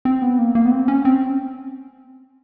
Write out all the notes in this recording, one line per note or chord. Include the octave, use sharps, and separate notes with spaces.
C4
B3
A#3
A#3
B3
C4
C#4
C4